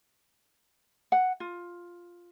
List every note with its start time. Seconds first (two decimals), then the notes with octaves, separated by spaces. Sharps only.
1.12 F#5
1.40 F4